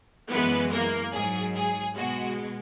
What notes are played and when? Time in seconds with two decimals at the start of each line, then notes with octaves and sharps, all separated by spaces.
0.30 F#2 E3 G#3 B3 B4
0.71 A#3 A#4
1.13 G#2 F#3 G#4
1.55 G#4
1.95 B2 G#3 F#4